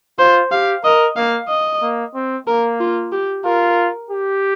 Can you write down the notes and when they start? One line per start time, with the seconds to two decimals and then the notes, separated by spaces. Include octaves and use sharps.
0.19 F4 C5
0.52 G4 F5
0.84 A#4 D#5
1.17 A#3 F5
1.49 D#5
1.82 A#3
2.15 C4
2.47 A#3 A#4
2.80 F4
3.12 G4
3.45 F4 A#4
4.10 G4